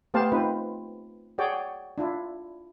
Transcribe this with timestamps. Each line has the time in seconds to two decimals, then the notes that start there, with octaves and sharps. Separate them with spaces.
0.14 A3 B3 G4 C5 F5 A5
0.32 C4 D#4 F4 B4
1.38 F#4 G#4 C#5 D5 G5
1.98 D4 E4 F4